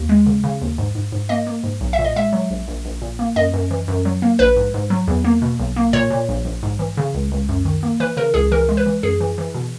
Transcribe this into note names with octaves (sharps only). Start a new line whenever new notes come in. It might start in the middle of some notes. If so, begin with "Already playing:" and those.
Already playing: D#2
G#3
C#3
C#3
D#2
G#2
G#2
G#2
A#3 D#5
A#3
G#2
B1
E5
A#2
D#5
G#3 E5
F#3
A#1
A#1
A#1
A#2
A#3
F#2 D#5
F#2
E3
F#2
F#3
A#3
A#1 B4
G#2
G#2
F#3
E2
A#3
B2
B1
A#3
A#2 C#5
A#2
A#1
A#1
G#2
E3
C#3
C#2
C#2
F#2
D#3
A#3
E3 B4
C#3 A#4
C#2 G#4
E3 A#4
G#3
B4
E3
F#2 G#4
E3
E3
B2